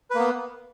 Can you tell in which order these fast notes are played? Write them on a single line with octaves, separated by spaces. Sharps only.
B4 A#3 B3